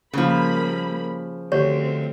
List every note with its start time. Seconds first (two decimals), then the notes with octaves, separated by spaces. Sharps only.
0.13 C#3 F3 G3 A#3 B5
1.52 D2 C4 G4 C#5